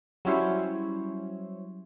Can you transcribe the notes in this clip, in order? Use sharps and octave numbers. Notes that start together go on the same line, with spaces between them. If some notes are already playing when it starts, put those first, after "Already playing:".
F#3 G3 C#4 E4 C5 C#5